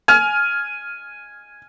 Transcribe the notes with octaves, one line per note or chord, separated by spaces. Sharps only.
G#5 F6